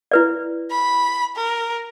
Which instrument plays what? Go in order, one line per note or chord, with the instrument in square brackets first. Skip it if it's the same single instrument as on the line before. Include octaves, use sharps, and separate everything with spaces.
[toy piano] E4 B4 D5
[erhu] B5
A#4